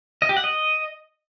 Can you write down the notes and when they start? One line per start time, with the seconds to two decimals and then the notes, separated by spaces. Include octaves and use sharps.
0.22 D#5
0.29 G4
0.37 F#5
0.44 D#5